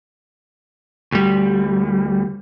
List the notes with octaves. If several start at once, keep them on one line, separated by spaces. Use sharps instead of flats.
D2 G3